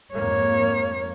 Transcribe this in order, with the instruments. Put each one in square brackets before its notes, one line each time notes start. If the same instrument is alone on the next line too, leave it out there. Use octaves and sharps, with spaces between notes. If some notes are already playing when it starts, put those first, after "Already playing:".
[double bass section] F2 G#2 A#3 [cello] C#5